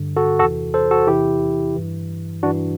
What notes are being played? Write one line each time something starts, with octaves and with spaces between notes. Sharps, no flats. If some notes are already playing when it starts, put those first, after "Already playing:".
Already playing: G2 D3
F#4 A4
E2 C3 E3 F#4 A4
A4 C5
F#4 A4
E2 C3 E3 E4 G4
G2 E3
G2 E3 D4 F#4